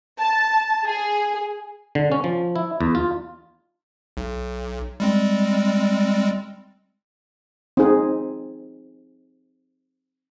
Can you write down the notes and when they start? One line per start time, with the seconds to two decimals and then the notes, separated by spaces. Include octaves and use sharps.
0.19 A5
0.86 G#4
1.95 D3
2.12 C#4
2.24 F3
2.56 E4
2.81 E2
2.95 F4
4.17 B1
5.00 G3 G#3 C4
7.77 C4 D#4 G#4